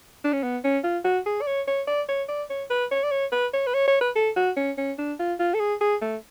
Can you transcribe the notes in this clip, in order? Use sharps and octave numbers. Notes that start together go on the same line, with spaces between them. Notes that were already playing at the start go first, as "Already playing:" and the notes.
D4
C#4
B3
C#4
F4
F#4
G#4
D5
C#5
C#5
D5
C#5
D5
C#5
B4
C#5
D5
C#5
B4
C#5
B4
C#5
C#5
B4
A4
F#4
C#4
C#4
D4
F4
F4
A4
G#4
G#4
A3